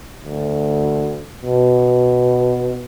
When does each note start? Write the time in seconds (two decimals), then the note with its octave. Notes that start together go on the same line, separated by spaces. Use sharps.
0.25 D2
1.42 B2